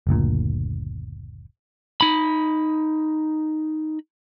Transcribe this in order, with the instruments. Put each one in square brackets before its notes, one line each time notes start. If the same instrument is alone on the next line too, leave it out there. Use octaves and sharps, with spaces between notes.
[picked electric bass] F#1 D2 A#2
[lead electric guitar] D#4 B5